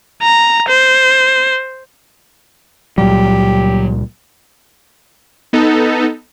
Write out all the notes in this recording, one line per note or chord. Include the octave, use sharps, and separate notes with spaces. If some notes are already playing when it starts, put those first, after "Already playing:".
A#5
C5
C#2 A#2 F#3 G3 G4
B3 D#4 A4